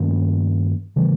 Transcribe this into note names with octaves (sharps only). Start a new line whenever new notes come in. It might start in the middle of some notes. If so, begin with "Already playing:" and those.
Already playing: G2 D#3 A#3 C#4
C#3 E3 G3